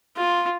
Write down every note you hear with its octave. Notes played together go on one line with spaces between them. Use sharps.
F4